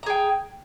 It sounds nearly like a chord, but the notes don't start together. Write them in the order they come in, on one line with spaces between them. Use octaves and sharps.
A#5 G#4 G5